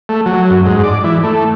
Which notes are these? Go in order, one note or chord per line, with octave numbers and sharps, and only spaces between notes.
A3
F#3
F#2
G#2
D5
E3
A3